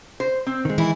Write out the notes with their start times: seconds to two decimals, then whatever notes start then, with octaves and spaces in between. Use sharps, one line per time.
0.20 C5
0.47 C4
0.65 D#3 G#3
0.78 E3 E4